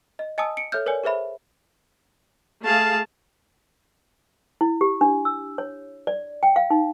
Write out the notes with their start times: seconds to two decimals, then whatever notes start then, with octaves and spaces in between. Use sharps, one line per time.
0.19 D#5
0.38 D#5 G#5 A5 D#6 E6
0.57 C#7 D7
0.72 A4 C#5 E5 F6 G6
0.86 A#4 B4 C#5 D5 G#5
1.04 G#4 B4 C5 E5 B5
2.65 A3 G#4 F5 A5
4.61 E4
4.81 G4
5.01 D4
5.25 E6
5.58 C#5
6.07 D5
6.43 G5
6.56 F5
6.70 D#4